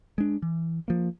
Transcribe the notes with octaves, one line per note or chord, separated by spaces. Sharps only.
G#3 D4
E3
F3 A#3